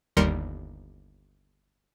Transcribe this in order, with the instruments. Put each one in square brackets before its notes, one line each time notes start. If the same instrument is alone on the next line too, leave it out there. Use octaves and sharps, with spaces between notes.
[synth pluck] G1 D#2 G3 A#4 C6 C#7